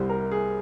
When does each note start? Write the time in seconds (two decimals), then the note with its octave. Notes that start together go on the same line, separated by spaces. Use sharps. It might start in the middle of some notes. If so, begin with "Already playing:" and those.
Already playing: C2 C3 G3 C5
0.09 A#4
0.32 G#4